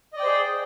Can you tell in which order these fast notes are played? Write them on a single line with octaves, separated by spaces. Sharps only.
D#5 D5 G5 C5 G#4